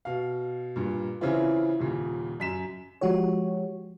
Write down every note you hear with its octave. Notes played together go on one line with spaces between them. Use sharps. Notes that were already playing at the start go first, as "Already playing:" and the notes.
B2 F5
G2 A#2
C#3 E3 C4 C#4 E4 F4
D#1 A#2 C#3
F#2 B6 E7
F3 G#3 F#4 G4 C#5